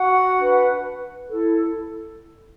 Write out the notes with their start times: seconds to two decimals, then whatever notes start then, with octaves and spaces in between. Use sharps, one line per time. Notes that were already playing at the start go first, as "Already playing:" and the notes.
Already playing: F#4 F#5
0.38 D4 B4
1.28 E4 A4